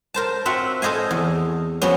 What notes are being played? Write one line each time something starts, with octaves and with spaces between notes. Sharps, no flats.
A#4 C5 A5
C4 F4 F#4 E5 F#5
A4 C5 D#5 F5 G#5
E2
F3 F#3 B3 C#4